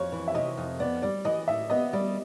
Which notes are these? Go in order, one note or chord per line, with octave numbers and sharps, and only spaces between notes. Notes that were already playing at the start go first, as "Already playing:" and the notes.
Already playing: F2 C#5
E3
E5
C3 D#5
F2
B3 D5
G3 D5
E3 D#5
A2 E5
B3 D#5
G3 D5